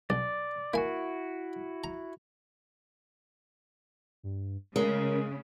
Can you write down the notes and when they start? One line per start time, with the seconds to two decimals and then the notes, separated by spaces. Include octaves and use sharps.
0.10 B1 D5
0.74 A#3 E4 F#4 G#5
1.84 A#5
4.23 G2
4.76 C#3 G#3 A#4